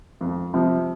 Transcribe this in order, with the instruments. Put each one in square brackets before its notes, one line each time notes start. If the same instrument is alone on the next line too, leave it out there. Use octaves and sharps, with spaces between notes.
[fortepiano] F2
C3 F3